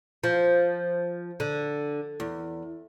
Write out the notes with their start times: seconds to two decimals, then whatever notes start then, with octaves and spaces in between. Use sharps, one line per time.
0.24 F3
1.40 D3
2.20 E2